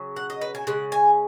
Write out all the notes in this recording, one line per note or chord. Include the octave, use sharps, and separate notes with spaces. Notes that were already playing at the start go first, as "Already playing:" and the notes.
Already playing: C#3 F#3
F#5
D#5
B4
G#5
C#3 G#3 F#5
G#5